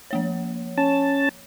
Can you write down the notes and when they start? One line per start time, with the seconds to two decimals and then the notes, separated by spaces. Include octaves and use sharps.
0.11 F3 A#3 C#5
0.78 C#4 A5